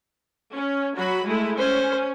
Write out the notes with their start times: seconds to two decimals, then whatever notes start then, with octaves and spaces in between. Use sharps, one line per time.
0.55 C#4
0.96 F#3 F#4 B5
1.26 G#3 A3 E4
1.58 C#4 C5